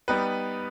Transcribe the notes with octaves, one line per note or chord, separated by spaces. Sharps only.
G3 B3 D#4 G4 B4